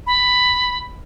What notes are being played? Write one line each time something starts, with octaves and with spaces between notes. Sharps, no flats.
B5